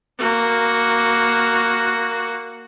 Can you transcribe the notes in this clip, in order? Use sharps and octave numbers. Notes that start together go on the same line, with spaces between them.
A#3 F#4